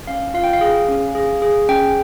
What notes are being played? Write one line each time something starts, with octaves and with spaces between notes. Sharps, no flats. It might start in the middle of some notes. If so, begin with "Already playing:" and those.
C#4 F5
F4 F5
G5
F5
G#4
C#4
G#4
G#4
C#4 G5